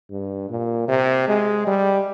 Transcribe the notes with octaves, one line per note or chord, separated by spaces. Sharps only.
G2
A#2
C3
G#3
G3